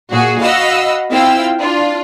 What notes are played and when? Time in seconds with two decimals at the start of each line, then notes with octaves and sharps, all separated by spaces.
0.11 A#2 F#4 G#4
0.42 F#4 D#5 F5 F#5 B5 E6
1.09 C4 E4 F4 F5 G5 E6
1.61 D4 F4